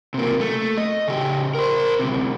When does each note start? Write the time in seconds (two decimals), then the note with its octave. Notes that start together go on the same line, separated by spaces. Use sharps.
0.14 C3 A#3
0.40 A3
0.77 D#5
1.08 C#3 G4
1.55 A#4 C5
1.99 D2 C3